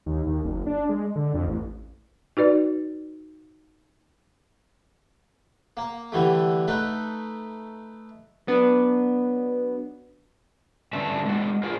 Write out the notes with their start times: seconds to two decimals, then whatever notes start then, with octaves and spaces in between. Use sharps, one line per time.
0.06 D#2
0.26 D#2
0.45 F#1
0.66 D4
0.89 G#3
1.16 D3
1.34 F2
1.48 A1
2.37 D#4 F#4 B4 D5
5.77 A#3
6.12 D3 E3 G3 A3
6.68 A3 D#4 B4
8.47 F#3 B3 D4
10.93 G2 D3 C#4 E5 A5
11.25 G#3 F#4
11.63 F4 G#4 A#4 C5